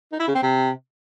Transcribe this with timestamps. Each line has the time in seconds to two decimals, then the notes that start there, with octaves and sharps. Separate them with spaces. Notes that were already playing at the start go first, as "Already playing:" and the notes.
0.12 D#4
0.20 E4
0.27 C#3
0.35 C4
0.42 C3